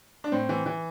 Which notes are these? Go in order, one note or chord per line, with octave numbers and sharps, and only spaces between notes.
D4
A2 C4
E3
E3